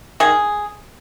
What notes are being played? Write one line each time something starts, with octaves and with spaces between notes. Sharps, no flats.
D#3 G#4